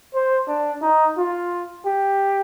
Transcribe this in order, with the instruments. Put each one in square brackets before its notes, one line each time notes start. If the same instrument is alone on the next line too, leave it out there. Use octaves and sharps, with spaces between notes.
[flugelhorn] C5
D4
D#4
F4
G4